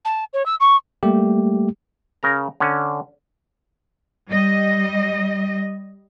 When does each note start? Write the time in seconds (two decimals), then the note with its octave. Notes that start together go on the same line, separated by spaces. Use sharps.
0.05 A5
0.33 C#5
0.46 E6
0.60 C#6
1.03 G3 A3 A#3 G4
2.23 C#3 A#4 A#5
2.60 D3 C#4
4.30 G3 D#5